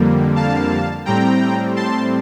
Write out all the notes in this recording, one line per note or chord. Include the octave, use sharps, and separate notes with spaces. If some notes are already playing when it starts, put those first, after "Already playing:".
Already playing: F2 D3 G3 A#3
F5 A5
A2 G3 C4 G5 A#5
A5 C6